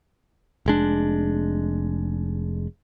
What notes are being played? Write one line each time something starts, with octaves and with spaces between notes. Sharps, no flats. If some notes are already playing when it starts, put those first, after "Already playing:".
F1 G#3 D4